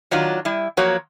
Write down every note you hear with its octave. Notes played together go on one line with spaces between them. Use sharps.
D#3 F#3 D4 F4
G3 E4
F3 F#3 A#3 F#4 C#5